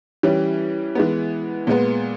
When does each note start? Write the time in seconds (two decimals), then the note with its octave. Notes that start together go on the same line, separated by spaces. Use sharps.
0.23 E3 G3 C#4
0.95 E3 G#3 B3
1.67 A#2 G#3 B3